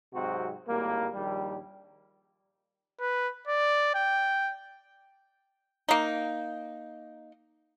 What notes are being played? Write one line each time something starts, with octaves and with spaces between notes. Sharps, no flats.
G#2 C3 F#3 C4 F#4
G#1 A2 G3 A#3
A#1 D#2 G3
B4
D5
G5
A#3 D#4